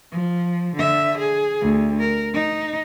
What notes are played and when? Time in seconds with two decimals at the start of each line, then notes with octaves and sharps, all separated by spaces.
0.11 F3
0.76 D3 E5
1.18 G#4
1.61 D2
1.99 A#4
2.34 D#4